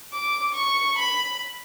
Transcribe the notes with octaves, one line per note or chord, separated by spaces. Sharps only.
D6
C#6
B5